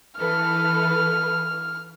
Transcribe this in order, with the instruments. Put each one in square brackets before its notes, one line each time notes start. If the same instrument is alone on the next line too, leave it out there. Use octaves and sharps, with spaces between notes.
[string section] E3 A4 B4 [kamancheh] F6